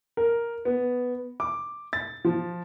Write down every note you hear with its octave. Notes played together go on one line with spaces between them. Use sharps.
A#4
B3
D6
A6
F3